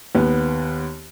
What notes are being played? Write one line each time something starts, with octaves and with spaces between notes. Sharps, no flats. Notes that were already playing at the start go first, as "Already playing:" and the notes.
D#2 B3